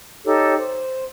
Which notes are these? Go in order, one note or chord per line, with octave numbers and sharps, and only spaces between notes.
D#4 G4 A4 C#5
C5